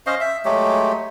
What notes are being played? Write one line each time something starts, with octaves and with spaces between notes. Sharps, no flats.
C#4 C5 D#5 F5
E5
F#3 G#3 A3 G4